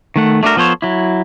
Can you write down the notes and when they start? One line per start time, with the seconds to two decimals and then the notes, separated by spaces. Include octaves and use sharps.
0.16 D#3 A3 F#5
0.43 A3 D4 F#4 A#4
0.57 F3 B3 A4 C5 C#5
0.82 F#3 E4